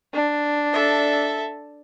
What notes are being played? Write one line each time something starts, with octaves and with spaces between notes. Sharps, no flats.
D4
A4 E5